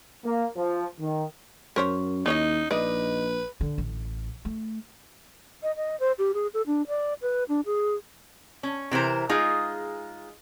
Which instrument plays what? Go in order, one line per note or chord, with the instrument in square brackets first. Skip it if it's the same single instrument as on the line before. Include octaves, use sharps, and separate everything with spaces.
[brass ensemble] A#3
F3
D#3
[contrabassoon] F#2 [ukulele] C#4 [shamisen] A#4 C5 C#5
[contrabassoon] D#2 [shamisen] E3 C#5 D#5 [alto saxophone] D#4
[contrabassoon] A#1 [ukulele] D4 D#4 D#5 [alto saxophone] B4 [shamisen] D5
[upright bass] D3
A1
A3
[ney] D#5
D#5
C5
G4
G#4
A4
D4
D5
B4
D4
G#4
[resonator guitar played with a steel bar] C#4
C3 E3 A#4 C5
G#3 D#4 F4 G#4